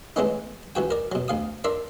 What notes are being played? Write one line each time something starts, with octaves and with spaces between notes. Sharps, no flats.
E3 G#3 A3 B3 C#4 D#4
C#2 E3 F#4 G5
A#4 D5
B2 F#3
D2 F5 D#6
D4 A#4 D5 E5 C6